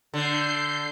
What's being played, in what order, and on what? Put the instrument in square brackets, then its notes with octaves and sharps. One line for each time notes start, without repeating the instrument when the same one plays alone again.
[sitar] D3 [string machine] G6 C7